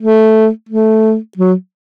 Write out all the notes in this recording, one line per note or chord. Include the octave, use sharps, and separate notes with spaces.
A3
A3
F#3